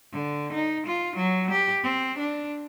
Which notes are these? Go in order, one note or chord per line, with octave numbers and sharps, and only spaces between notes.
D3
D#4
F4
F#3
G4
C4
D4